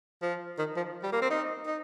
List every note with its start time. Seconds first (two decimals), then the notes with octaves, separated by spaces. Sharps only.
0.22 F3
0.58 D#3
0.76 F3
1.03 G3
1.12 A#3
1.22 C4
1.30 D#4
1.67 D#4